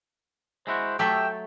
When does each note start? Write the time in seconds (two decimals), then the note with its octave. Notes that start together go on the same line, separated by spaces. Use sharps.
0.67 G#3 E4 F#4 C5
0.99 F#3 A3 G4 A4 E5 G5